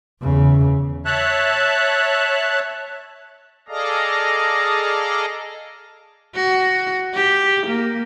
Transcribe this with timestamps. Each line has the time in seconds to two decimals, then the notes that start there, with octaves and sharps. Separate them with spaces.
0.21 E2 C#3
1.05 C#5 E5 A5 F#6
3.68 G#4 A4 D5 D#5 F5 A#5
6.35 F#4
7.14 G4
7.67 A#3